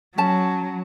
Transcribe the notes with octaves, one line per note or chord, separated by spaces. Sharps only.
F#3 C#4 A5